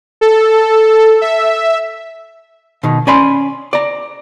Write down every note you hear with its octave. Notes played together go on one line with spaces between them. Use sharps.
A4
E5
B2 D#3
C#4 D5 G#5 B5 C6
D5 A#5